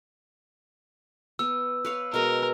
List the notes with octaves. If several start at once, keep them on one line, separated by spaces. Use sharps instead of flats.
B3 E6
B4 C#5 F5
B2 G#3 A#4 D#5